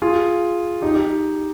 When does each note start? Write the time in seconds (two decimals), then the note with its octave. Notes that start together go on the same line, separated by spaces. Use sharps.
0.02 F4 G#4
0.82 D#4 G4
0.95 D#4 G4